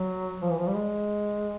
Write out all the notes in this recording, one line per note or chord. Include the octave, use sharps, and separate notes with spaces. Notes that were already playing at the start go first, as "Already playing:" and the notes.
Already playing: F#3
F3
E3
F3
G3
G#3